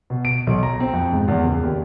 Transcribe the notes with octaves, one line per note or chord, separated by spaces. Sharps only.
B2
D7
B1
A#5
C4
F2
G#2
E2
C#2
D#2